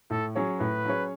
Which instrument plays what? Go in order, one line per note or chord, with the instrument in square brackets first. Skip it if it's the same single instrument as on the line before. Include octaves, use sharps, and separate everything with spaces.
[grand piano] A2 [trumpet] A4
[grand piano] F#3 C#4 G#4 C#5
[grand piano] A2 [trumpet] B4
[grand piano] F#3 C#4 G#4 C#5